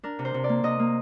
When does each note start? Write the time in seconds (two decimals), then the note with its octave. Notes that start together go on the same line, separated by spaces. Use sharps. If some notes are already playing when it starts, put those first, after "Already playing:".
0.03 D4 A#4
0.19 C3
0.25 C5
0.34 C3
0.44 D5
0.49 A#3
0.63 C3 D#5
0.79 A#3